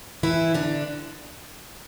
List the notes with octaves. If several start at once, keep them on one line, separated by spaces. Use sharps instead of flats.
E3 E4
D3 D4